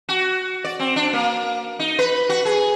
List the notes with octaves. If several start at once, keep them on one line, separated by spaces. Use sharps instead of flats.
F#4
D5
C4
D4
A#3
D#4
B4
F#4
G#4